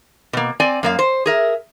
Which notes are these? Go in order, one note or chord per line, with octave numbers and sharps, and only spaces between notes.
B2 A#3
C4 D5 G#5
F#2 A#3 F5
C5
G#4 A#4 E5